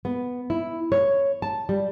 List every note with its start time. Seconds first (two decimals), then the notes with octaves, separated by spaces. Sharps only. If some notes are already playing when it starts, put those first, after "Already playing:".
0.05 B3
0.50 E4
0.92 C#5
1.42 A5
1.69 G3